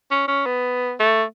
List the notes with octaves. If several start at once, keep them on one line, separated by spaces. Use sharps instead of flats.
C#4
C#4
B3
A3